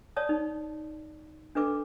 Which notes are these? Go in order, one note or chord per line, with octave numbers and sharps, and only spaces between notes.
C#5 D5 A5 D#6
D#4
D4 A4 B4 D6